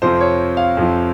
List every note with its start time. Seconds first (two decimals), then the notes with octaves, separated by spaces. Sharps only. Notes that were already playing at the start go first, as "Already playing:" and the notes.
0.02 F2 C3 F3 C5
0.21 C#5
0.57 F5
0.77 F2 C3 F3